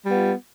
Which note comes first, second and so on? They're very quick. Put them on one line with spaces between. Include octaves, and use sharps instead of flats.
G3 B3 F4